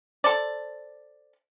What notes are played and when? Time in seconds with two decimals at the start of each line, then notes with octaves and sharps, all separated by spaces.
0.24 A4 C5 D5